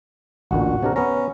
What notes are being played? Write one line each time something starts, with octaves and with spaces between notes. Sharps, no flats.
A1 D2 A#2 F#4
C3 D4 A#4
B3 C#4 A#5